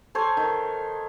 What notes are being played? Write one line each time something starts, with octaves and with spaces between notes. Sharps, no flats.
A4 C5 C#5 G#5
D#3